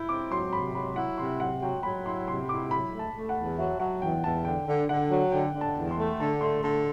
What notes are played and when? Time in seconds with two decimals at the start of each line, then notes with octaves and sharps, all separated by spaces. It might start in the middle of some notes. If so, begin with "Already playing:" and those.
Already playing: E4 G6
0.09 C4 D6
0.31 F#3 C6
0.53 C3 B5
0.75 F#3 B5
0.96 E4 F#5
1.18 C3 C6
1.40 F#3 F#5
1.62 F#3 G5
1.83 F#3 B5
2.05 E4 C6
2.27 C3 C6
2.49 E4 D6
2.71 F#3 B5
2.93 A3
2.99 A5
3.14 A3
3.29 F#5
3.37 E2
3.57 F#3 E5
3.79 F#3 F#5
4.01 E2 G5
4.24 E2 A5
4.45 D3 G5
4.67 D3
4.89 D3 F#5
5.11 F#3
5.32 D3 G5
5.54 D3
5.61 A5
5.76 E2
5.91 C6
5.98 A3
6.19 D3 A5
6.41 A3 C6
6.63 D3 A5